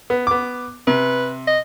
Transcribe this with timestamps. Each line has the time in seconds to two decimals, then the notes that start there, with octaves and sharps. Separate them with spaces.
0.10 B3
0.27 B3 D6
0.87 C3 B4
1.47 D#5